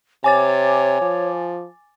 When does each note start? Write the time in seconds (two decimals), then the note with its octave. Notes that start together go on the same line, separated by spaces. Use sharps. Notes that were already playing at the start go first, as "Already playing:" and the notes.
0.24 C3 C#5 G#5 D6 A6
1.02 F3